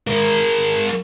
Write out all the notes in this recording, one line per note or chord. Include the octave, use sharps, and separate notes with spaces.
G#3 A#4